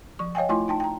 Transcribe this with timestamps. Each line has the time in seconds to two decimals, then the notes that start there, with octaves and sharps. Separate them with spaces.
0.19 F3 C#6
0.35 C#5 D#5 F5 G5 G#5
0.49 A3 E4 F4 G#5 C6
0.68 D#4 G5 A5
0.80 G5 A#5